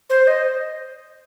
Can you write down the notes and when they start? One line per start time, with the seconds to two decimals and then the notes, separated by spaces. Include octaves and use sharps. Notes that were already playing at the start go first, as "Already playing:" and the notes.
0.10 C5
0.27 D#5